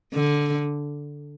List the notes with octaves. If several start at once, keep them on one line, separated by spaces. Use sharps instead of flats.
D3